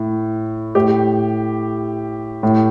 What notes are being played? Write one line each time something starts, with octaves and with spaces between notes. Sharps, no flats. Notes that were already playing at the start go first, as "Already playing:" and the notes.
Already playing: A2
A2 G4
A2